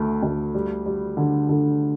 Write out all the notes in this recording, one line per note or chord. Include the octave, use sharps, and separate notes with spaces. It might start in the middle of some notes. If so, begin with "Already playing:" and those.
Already playing: D2 A3
D2
G3
G3
D3
D3